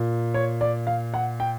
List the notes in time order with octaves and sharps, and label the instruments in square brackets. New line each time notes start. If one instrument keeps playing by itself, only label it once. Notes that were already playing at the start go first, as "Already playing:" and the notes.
Already playing: [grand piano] A#2
C#5
D5
F5
F#5
G5